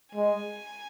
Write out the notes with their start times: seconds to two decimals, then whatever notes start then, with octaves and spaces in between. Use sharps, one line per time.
0.15 G#3 G#5